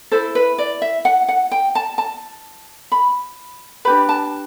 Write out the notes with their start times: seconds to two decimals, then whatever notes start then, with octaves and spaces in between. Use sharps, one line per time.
0.11 E4 A4 C5
0.35 B4
0.58 D5
0.82 E5
1.05 F#5
1.28 F#5
1.51 G5
1.75 A5
1.98 A5
2.92 B5
3.85 D4 G4 B4 B5
4.09 A5